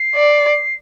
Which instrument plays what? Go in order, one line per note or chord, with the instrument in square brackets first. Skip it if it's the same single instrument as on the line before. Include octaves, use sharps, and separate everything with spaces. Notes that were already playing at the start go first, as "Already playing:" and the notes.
Already playing: [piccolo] C7
[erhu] D5